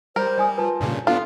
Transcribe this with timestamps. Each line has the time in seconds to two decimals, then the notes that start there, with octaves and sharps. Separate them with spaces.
0.16 G3 A#4 C5
0.37 D5 G#5 D#6
0.58 F4 B4 A5
0.80 G2 A#2 C#3
1.07 B3 D4 F4 A4